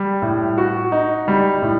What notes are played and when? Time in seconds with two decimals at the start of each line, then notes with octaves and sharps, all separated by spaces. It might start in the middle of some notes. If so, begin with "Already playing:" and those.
Already playing: G3
0.22 A2
0.58 F#4
0.92 D#4
1.28 G3
1.62 A2